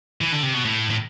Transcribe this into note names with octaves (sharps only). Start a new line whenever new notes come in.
E3
D3
C3
B2
A2
A2